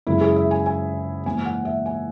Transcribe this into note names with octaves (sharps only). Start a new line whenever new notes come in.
F#2 C#3 G#3 E4
G#4
E5
G#5
G#5
G#2 E3 A#3 G#5
F#5
E5
G#5